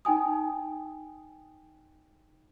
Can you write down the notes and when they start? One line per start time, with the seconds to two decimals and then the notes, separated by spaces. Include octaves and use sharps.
0.05 D#4 G5 G#5 D#6